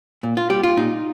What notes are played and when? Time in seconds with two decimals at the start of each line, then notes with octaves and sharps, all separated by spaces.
0.23 A#2
0.37 F4
0.50 G3 G4
0.63 F4
0.77 A#2 D#4